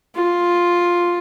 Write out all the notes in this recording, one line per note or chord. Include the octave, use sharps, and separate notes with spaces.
F4